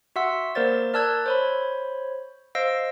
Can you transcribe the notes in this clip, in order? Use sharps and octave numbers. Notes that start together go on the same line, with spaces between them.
F#4 E5 F#5 C6 E6
A#3 A#4 C5 D5 A6
A#4 D5 A5 E6 F#6 G#6
C5 C#5 B5
C5 D#5 F5 E6 A#6 D7